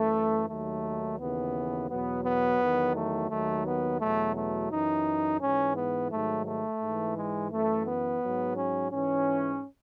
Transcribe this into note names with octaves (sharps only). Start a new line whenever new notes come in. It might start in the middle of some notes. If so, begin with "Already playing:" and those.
Already playing: F#2 E3 A3
D#2 D#3 F#3 A3
D#2 C#3 E3 B3
E2 B2 F#3 B3
B3
E2 D#3 F#3
A3
D#2 D#3 F#3 A3
B3
E2 B2 F#3 A3
A3
F#2 E3 D#4
G#2 E3 C#4
B3
G#2 D#3 F#3 A3
A3
G#2 E3
G#3
F#2 E3 A3
B3
G#2 F#3
C#4
G#2 E3 C#4